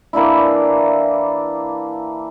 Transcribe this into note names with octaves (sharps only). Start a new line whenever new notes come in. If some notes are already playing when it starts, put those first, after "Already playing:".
E3 A#3 D4 E4